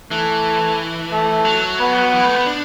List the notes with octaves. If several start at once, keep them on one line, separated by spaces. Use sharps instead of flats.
E3 A3
A3
F#3
B3
E3
A3
B3
D4